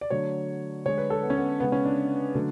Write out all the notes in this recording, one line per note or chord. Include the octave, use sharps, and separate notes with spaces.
D5
D3 F#3 A3 C#5
D3 G#3 C#5
B4
A4
B3
C#4
B3
C#3 G#3 B3
C#4
D4
D3 F#3 A3